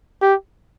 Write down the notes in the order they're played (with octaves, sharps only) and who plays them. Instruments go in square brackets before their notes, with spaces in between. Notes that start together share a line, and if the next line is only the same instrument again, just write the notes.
[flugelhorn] G4